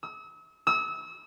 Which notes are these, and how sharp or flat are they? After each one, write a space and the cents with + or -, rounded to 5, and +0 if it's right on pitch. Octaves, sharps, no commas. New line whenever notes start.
E6 -40
E6 -35